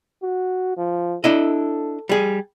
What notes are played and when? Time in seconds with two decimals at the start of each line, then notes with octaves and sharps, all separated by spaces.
0.22 F#4
0.77 F3
1.24 D4 E4 A4 D#5
2.09 G3 G#4